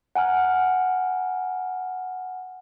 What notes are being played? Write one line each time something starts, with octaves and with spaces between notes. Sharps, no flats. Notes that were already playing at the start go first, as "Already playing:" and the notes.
F#5 G#5 A#5 F6